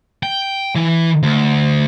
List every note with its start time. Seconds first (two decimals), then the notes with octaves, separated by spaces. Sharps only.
0.23 G5
0.75 E3
1.23 D2